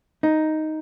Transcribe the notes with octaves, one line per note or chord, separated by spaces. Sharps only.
D#4